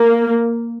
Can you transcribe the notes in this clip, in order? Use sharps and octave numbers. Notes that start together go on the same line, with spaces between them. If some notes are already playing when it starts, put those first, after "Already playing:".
Already playing: A#3